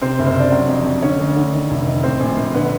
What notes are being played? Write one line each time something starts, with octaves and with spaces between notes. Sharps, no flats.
C3 C4 C5
F#1
C4 C5
C3 D4 D5
F#3
F2
F2
D3 C#4 C#5
D2
D3
D#3
F1
D#3
A2 C4 C5
A#1
A#1
D3 B3 B4